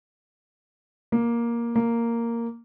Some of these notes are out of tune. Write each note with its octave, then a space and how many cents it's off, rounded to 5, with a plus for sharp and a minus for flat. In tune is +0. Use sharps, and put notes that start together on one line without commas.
A#3 +10
A#3 -5